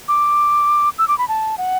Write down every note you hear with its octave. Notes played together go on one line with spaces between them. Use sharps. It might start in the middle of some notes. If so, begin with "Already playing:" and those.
D6
E6
D6
B5
A5
F#5